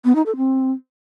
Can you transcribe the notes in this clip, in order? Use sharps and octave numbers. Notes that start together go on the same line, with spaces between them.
B3
D#4
A4
C4